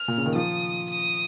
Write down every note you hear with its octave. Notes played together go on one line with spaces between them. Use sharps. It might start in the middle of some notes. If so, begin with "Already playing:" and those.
Already playing: F6
A#2
C#3
D#3
F3 D#6
D#6